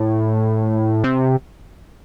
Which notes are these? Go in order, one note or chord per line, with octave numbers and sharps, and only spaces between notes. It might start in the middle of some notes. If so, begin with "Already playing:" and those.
Already playing: A2
C3